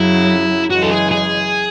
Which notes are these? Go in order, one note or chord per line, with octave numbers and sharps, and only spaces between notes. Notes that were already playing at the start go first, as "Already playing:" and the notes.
Already playing: F#2 C#3 F#3 E4
F#2 C#3 E3 G#3 F#4
A4
G#4
G#4